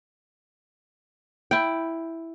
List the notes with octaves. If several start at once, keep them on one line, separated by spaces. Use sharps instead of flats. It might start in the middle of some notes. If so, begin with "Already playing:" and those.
E4 G5